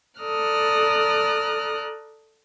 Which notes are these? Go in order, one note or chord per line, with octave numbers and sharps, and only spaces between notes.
A4 D5 A#5 D#6 F6 F#6